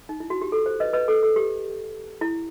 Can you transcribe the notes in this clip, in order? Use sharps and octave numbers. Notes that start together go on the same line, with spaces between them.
D#4
E4
F#4
G4
A4
C5
B4 D#5
B4 D#5
A4
A4
G4
E4